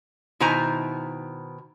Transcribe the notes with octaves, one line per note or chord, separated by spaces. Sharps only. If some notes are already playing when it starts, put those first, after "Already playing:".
B2 D#3 E4 C5 G#5 A#5